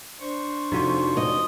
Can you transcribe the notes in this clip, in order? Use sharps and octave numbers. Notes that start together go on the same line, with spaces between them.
D4 C5 C#6
F2 C3 F3 D#4 F#4 C6
D#5